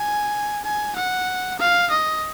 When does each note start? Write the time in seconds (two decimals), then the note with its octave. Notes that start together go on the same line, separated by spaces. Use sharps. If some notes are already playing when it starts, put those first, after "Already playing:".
Already playing: G#5
0.64 G#5
0.96 F#5
1.59 F5
1.90 D#5